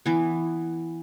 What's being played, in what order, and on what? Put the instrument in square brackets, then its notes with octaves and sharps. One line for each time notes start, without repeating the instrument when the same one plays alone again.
[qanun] E3 B3